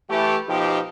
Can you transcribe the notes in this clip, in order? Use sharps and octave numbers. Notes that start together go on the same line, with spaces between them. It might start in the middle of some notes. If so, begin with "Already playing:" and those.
E3 A3 G4
B2 F3 D#4 G4